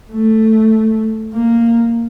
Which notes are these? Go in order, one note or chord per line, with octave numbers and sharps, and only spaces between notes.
A3
A#3